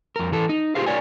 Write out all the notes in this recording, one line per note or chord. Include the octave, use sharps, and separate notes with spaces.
F2 A#4
E3 A4
D#4
F4 G4 G#4 C5 F5
F#4 A#4 C#5 D5 F#5 G#5